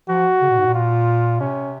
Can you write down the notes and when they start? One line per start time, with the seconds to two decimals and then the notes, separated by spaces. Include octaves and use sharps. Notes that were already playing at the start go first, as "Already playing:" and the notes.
0.09 F3 F#4
0.41 C#3
0.50 A#2
0.59 G#2
0.66 A#2
0.74 F4
1.39 C3 C#4